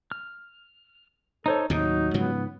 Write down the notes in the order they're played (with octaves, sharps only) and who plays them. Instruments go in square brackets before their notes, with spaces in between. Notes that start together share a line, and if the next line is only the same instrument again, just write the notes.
[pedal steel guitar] F6
[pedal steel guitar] D#4 C5 C#5 [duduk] A4
[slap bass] D#2 A2 C3 [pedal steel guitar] F#3 [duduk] D#4
[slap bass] G#2 C#3 F3 [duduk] B3